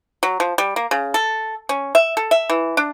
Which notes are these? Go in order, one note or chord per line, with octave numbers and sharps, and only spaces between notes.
F#3
F3
G3
A#3
C#3
A4
C#4
E5
A4
E5
E3
D4